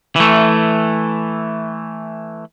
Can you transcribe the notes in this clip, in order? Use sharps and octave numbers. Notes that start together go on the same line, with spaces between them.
E3 A3